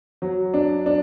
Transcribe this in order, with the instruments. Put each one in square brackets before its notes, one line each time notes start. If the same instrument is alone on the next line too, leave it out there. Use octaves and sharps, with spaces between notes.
[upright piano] F#3
D4
D4